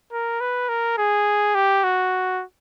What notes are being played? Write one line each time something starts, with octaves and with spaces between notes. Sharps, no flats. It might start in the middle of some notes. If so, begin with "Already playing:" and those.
A#4
B4
A#4
G#4
G4
F#4